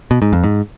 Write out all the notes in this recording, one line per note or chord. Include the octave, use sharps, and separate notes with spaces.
B2
G#2
F2
G#2